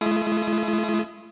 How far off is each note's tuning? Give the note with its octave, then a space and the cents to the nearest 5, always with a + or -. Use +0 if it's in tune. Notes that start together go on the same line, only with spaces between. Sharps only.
A3 -45 E4 +45 D#6 +0